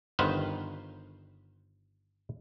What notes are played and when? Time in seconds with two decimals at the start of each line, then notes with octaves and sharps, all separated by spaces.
0.19 G1 D#3 B4 C5 F5 F#5